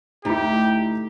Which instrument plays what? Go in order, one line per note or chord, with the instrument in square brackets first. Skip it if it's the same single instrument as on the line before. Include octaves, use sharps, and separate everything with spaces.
[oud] D2 [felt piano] D#4 E4 [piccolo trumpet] G4